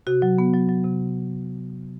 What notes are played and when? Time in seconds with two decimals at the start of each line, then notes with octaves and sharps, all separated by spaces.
0.07 C3 F#4
0.22 F#3
0.38 B3
0.54 F#3
0.69 F#3
0.84 C3